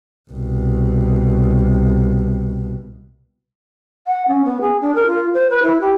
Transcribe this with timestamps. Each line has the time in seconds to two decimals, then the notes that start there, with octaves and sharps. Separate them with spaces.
0.31 C2 B2
4.07 F#5
4.28 C#4
4.45 B3
4.61 G#4
4.81 D4
4.95 A#4
5.07 F4
5.34 C5
5.50 B4
5.63 E4
5.81 G4